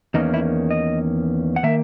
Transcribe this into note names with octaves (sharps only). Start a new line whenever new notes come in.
E2 D#3 A#3 C#4 D#4
E4
D#5
F#5
D#3 A#3 E5